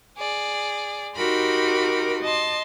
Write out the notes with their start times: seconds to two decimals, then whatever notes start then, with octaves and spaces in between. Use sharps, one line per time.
0.18 G#4 D5
1.16 D#4 F#4 G4 A#4 B5 C6
2.23 D#5 A5 C6